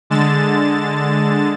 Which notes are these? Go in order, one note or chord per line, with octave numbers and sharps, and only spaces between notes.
D3 G#3 A6 E7